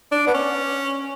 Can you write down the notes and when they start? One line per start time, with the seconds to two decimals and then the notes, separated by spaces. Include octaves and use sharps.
0.12 D4
0.27 B3
0.34 C#4